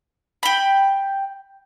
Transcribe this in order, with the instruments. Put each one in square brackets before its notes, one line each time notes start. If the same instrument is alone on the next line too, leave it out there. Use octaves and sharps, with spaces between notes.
[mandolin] G5 B5